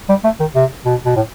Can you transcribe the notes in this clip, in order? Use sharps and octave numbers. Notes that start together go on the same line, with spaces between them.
G3
A3
D#3
C3
B2
B2
A2